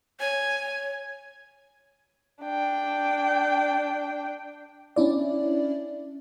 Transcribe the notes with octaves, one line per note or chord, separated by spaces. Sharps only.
C#5 G#5
D4 G5
C#4 D4 E4 D5